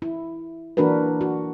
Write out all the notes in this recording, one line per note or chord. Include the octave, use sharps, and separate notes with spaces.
E4
E3 A#3 D4 F#4 A#4 B4
F#4